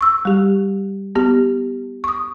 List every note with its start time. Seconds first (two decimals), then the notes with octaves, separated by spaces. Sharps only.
0.01 C#6 E6
0.25 G3 G4
1.15 B3 G4
2.04 C#6 D#6